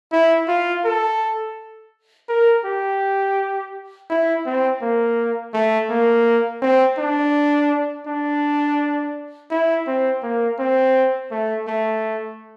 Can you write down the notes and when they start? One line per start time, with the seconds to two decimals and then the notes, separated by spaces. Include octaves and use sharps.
0.12 E4
0.48 F4
0.85 A4
2.29 A#4
2.65 G4
4.10 E4
4.46 C4
4.82 A#3
5.53 A3
5.89 A#3
6.62 C4
6.98 D4
8.07 D4
9.51 E4
9.87 C4
10.23 A#3
10.59 C4
11.31 A3
11.67 A3